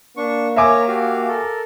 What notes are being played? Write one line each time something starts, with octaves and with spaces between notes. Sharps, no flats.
A#3 D4 C#6
A#4 C#5 E5 G#5 A#5 D6
F#4 G4 F5
A4 A#4